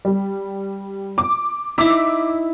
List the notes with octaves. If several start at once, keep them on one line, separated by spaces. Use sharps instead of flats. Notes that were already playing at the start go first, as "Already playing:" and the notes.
G3
D6
D#4 E4 D6 E6 B6